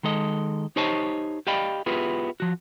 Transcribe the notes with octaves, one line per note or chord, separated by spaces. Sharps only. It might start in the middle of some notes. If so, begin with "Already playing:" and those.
D#3 G#3 A4 D#5
D#4 G4 C5 C#5 D#5 A5
G4 D5 D#5 F5 G5 B5
B3 E4 F4 G4 G#4 B4
F3 F#4